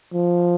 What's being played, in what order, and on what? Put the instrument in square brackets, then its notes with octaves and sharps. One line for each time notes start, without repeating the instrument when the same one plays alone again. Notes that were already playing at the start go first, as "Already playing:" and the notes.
[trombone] F3